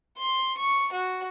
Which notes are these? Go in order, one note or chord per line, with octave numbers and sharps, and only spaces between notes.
C6
C#6
F#4